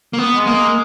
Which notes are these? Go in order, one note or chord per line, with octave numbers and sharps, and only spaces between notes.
A#3
B3
G#3
A#3